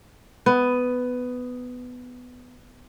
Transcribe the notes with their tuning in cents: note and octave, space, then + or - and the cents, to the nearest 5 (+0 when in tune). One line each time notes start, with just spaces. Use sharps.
B3 +10